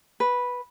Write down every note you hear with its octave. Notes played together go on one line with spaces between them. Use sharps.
B4